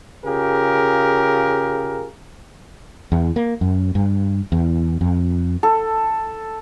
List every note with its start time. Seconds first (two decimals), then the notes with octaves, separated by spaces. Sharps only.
0.25 C#3 F4 G4 G#4 A#4
3.12 E2
3.36 A#3
3.61 F#2
3.95 G2
4.52 E2
5.01 F2
5.63 A4